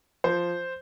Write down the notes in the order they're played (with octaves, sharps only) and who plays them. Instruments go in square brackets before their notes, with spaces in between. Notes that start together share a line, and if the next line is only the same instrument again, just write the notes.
[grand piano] F3 C5